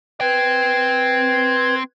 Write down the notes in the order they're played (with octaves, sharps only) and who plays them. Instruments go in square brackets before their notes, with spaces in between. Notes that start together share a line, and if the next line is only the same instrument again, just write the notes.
[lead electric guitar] C4 G5 [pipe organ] B4 G#6